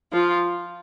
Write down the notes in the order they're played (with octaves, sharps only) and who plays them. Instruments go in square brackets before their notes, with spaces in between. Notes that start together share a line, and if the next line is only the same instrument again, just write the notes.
[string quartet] F3 F4